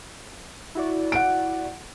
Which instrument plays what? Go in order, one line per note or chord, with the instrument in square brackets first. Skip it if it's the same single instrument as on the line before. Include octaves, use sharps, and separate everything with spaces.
[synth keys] E4 F#4 D5
[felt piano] F#5 D7